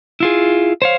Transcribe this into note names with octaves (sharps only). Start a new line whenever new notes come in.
E4 F4 G#4
C5 C#5 F5